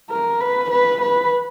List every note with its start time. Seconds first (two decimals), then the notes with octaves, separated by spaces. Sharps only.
0.10 A#4
0.41 B4
0.71 B4
1.02 B4